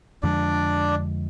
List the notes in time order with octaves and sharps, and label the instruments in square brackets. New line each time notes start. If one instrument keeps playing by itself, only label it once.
[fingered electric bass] F2 D3 F3 G#3 [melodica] D4 D5